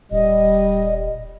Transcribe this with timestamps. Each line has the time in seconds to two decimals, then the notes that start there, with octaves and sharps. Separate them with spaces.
0.11 D#1 G3 D#5